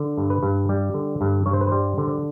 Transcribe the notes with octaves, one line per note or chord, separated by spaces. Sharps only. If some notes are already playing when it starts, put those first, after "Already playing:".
Already playing: D3
G2
B4
G2
G3
D3
G2
G2 C#5
C5
B4
G3 C5
D3